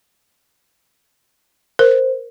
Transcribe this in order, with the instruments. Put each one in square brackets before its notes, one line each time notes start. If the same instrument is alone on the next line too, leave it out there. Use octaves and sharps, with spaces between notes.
[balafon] A#4 [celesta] C5